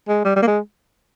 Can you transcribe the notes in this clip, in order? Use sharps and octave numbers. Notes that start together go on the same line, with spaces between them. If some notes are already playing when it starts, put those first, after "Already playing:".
G#3
G3
G3
A#3
G#3